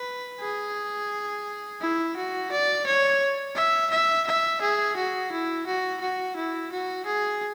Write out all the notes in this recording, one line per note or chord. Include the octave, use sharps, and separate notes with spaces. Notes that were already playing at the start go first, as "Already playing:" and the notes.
Already playing: B4
G#4
E4
F#4
D5
C#5
E5
E5
E5
G#4
F#4
E4
F#4
F#4
E4
F#4
G#4